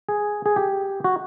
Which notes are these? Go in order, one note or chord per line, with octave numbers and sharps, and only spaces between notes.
G#4
G#4
G4
F#4